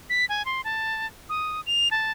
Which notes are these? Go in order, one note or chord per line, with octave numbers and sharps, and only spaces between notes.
B6
G#5
C6
A5
D#6
F7
A5